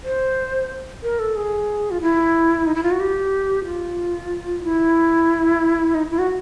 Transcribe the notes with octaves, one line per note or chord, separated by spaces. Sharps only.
C5
A#4
A4
G#4
F4
E4
D#4
E4
F4
F#4
G4
F4
E4
D#4
E4
F#4